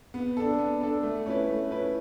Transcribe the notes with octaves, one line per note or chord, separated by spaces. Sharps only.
B3
D4 A4
B3
D4 A4
A3
C#4 E4 B4
A3
C#4 E4 B4